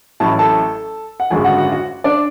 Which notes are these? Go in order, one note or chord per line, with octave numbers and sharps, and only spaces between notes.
A1 A2 F#3 C#4 E4 A5
A4 A5
F#5
G#1 F#2 D3 G#3 C#4 G#4 G#5
F#4 F#5
F#4 F#5
F#4 F#5
D4 D5